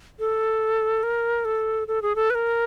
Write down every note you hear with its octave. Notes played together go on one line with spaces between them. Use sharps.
A4
A#4
A4
A4
G#4
A4
B4
A#4